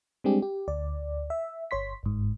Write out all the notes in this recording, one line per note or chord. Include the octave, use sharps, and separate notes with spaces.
G3 G#3 C4 D4 G4 G#4
G4
D2 D5
E5
G1 C#5 C6 B6
G1 G#2